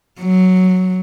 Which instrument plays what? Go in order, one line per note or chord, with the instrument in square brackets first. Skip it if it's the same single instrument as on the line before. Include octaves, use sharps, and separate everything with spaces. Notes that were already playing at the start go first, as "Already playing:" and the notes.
[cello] F#3